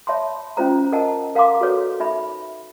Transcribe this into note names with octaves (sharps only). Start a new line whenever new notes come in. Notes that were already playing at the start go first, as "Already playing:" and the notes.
C#5 E5 A5 B5 C6
C#4 F4 C5 A#5
A#4 D#5 F#5 A5 A#5
A#4 F5 F#5 A#5 C6 D6
F#4 A4 B4 C#5
D#4 E5 B5